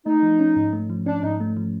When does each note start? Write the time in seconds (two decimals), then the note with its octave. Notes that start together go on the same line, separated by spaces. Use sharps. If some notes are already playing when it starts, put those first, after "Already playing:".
0.06 A3 D#4
0.23 F3
0.39 C#4
0.56 G#2
0.73 A3
0.90 F3
1.06 C#4 D4
1.23 G#2 D#4
1.40 A3
1.57 F3